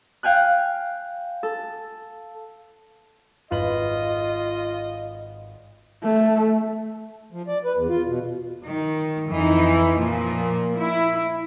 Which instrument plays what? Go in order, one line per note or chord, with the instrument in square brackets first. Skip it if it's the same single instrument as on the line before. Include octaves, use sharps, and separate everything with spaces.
[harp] F5 G5 G#5 F#6
A4
[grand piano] G#1 B4 F#7 [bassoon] F4 [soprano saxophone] D#5
[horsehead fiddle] A3
[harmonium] F3
D5
B4
E2
F4
B2
[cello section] D#3
F2 E3 D#4
A#2 F3 A#3
E4